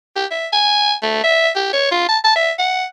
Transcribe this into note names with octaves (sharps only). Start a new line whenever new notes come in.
G4
E5
G#5
A3
E5
G4
C#5
F4
A5
A5
E5
F#5